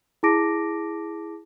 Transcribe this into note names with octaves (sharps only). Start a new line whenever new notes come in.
E4 G#4 A5 D6 A#6 D7